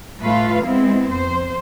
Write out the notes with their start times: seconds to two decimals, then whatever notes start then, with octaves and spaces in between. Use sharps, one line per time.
0.21 A2 A3 F4 B4 F5
0.65 G#3 B3 C4 E4
1.09 F2 C5